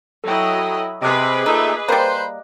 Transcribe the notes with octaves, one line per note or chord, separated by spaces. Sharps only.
F#3 E4 A4 D#5 G5
C3 G#4 B4 D#5 D6 F#6
A#2 A3 D#4 E5
G3 A#3 B4 C5